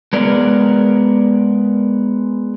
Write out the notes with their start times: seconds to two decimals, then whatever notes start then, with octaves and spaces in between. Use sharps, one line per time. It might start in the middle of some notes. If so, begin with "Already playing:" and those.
0.13 G#3 B3 A#4 D5